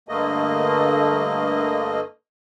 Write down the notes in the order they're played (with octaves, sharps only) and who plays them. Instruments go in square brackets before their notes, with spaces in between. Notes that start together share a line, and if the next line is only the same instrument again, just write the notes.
[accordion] G2 D3 A3 A#3 D#5